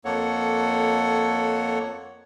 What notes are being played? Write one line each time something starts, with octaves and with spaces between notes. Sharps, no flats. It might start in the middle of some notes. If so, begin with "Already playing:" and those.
F2 A#3 A4 C#5 F#5